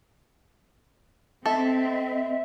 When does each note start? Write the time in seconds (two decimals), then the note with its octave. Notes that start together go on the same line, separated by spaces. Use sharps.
1.46 C4 A4 D#5 E5